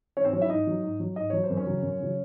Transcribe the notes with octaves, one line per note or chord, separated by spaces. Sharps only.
G#2 C#4 C#5
C4 C5
F#3 C#4 C#5
E4 E5
G#2 D#4 D#5
F#3
G#2
F#3
G#2 D#5
F#3 C#5
C5
F#2
C#4 C#5
C#3 F#3
F#2
C#3 F#3